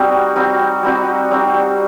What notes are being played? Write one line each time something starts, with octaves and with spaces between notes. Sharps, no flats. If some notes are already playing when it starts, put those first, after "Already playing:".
Already playing: G3 C4 D#4 F#4
G3 C4 D#4 F#4
G3 C4 D#4 F#4
G3 C4 D#4 F#4